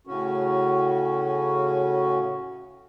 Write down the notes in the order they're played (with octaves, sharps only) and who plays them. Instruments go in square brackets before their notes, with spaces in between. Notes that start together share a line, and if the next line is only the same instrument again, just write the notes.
[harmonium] A2 C#3 C#4 F#4